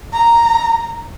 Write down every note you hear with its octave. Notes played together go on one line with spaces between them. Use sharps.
A#5